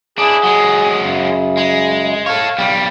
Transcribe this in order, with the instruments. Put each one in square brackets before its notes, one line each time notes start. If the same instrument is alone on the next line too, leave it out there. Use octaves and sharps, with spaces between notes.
[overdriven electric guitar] D4 E4 [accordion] G#4
[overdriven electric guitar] F#3 G#3
[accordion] F#2 C#3
[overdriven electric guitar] G#3
[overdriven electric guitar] A4 C#5 [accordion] F5
[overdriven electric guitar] B1 G3